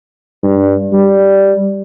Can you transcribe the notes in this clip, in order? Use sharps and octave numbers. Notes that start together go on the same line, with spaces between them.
G2
G3